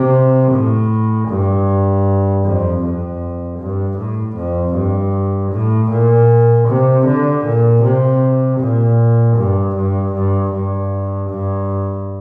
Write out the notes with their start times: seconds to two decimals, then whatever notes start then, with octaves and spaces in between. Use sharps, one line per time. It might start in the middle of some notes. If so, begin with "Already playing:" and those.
Already playing: C3
0.52 A2
1.29 G2
2.44 F2
2.83 F2
3.59 G2
3.98 A2
4.36 F2
4.75 G2
5.52 A2
5.91 A#2
6.68 C3
7.06 D3
7.45 A#2
7.83 C3
8.60 A#2
9.36 G2
9.75 G2
10.14 G2
10.52 G2
11.30 G2